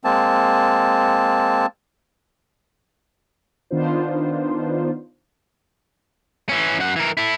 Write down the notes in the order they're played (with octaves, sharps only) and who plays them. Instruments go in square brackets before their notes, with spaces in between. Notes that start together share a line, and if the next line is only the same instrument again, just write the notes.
[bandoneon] G#3 A#3 C4 A5
[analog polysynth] D#3 B3 D4 D#4 F4 C5
[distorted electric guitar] E3 C#4
F#2 F#5
E3 A#4
E4 A4